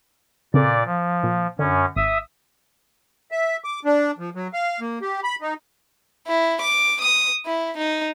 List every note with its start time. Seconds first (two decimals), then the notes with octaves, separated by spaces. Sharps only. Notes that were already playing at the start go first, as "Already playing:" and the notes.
0.54 A#2 C#3 C4 A4 D5
0.86 F3
1.23 A#2
1.59 F#2 D3 C#4
1.96 G#1 E5 D#6
3.31 E5
3.64 D6
3.85 D4
4.19 F3
4.35 F#3
4.53 F5
4.80 A#3
5.02 G4
5.24 B5
5.41 D#4
6.27 E4
6.61 D6
7.01 D#6
7.46 E4
7.77 D#4